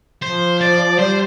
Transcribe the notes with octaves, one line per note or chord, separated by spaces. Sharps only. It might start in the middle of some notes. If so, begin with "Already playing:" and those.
F3 C5
D5
G3 C5